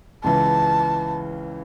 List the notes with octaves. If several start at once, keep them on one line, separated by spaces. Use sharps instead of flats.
C#2 C#3 E3 A5